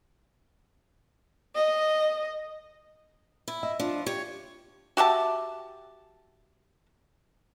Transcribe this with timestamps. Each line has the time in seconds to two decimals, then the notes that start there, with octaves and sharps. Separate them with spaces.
1.53 D#5
3.48 E4
3.63 D#5 E5
3.80 F3 D4
4.06 G4 C#5
4.97 F#4 G4 E5 A5